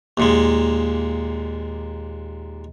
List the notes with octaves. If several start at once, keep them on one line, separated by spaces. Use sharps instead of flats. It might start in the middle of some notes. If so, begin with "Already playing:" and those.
D#2 A#2 G#3